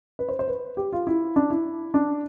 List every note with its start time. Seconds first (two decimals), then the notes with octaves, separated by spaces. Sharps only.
0.19 B4
0.29 C5
0.39 C5
0.48 B4
0.77 G4
0.93 F4
1.07 E4
1.36 D4
1.50 E4
1.94 D4